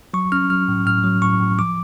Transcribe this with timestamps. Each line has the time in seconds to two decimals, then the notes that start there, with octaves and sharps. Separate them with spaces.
0.14 F#3 C#6
0.32 C#4 F6
0.50 F#3 F6
0.68 A2
0.86 A2 F6
1.04 F#3
1.22 A2 C#6
1.40 A2
1.59 F3 D6